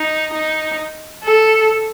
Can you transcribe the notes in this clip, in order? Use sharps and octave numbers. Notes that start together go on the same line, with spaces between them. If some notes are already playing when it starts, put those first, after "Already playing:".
Already playing: D#4
D#4
A4